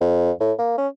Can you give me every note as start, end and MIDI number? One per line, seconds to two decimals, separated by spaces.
0.01 0.32 41
0.40 0.53 45
0.59 0.74 58
0.78 0.88 61